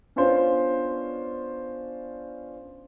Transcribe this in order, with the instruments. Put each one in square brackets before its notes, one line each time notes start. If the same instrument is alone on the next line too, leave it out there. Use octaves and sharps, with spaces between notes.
[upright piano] B3 C#4 D4 F4 C5